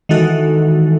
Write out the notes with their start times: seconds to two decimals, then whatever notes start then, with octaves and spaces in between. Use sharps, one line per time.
0.09 D#3 E3 G#3 D#4 F#4 A4